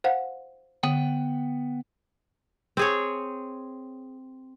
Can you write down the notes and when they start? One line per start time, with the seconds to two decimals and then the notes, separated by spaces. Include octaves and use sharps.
0.04 C5 F5 F#5
0.83 D3 B3 F#5 G5
2.77 C4 G#4 C#5